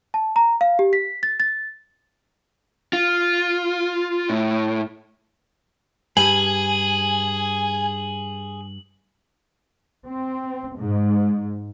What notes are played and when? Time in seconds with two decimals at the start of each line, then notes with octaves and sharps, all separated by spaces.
0.14 A5
0.36 A#5
0.61 F5
0.79 G4
0.93 B6
1.23 A6
1.40 A6
2.93 F4
4.30 A2
6.17 G2 G#4 G#5 F#7
10.07 C4
10.77 G#2